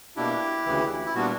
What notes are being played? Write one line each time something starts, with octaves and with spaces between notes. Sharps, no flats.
B2 A#3 D4 E4 G4
D2 C#3 E3
E4
A#2 G3 B3 D4 F#4